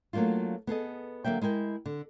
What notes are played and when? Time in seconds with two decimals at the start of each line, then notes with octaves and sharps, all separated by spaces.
0.13 F#3 A3 A#3 D4 F4
0.67 B3 G#4 A4 D#5
1.24 D3 F#3 A#3 E5 G5
1.42 G#3 E4 A#4 G5
1.86 D3